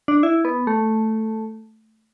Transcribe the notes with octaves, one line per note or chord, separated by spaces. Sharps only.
D4
E4
B3
A3